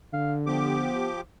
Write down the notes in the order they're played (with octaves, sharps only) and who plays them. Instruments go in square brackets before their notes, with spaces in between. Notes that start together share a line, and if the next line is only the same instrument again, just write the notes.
[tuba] D3 [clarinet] F5
[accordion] F3 G4 D6 [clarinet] B3